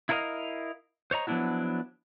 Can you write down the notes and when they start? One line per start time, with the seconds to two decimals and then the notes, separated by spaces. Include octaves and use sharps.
0.09 E4 F4 A#4 C5 D#5 F5
1.11 C5 C#5 D#5 A#5
1.27 F3 F#3 B3 D4 E4 F#4